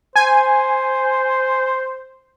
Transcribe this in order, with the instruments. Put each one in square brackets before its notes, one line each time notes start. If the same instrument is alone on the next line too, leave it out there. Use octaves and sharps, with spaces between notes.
[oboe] C5 [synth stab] G#5